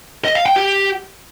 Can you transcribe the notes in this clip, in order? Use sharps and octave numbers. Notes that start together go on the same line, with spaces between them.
D#5
F5
G5
G4